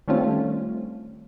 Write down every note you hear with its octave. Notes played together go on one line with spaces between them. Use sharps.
D#3 G3 A3 C4 C#4 F4